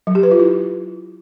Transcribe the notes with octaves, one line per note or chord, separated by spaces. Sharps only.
F#3
G4
B4
F4
E4